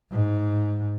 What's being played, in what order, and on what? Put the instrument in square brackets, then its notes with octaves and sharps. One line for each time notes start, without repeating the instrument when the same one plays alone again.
[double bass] G#2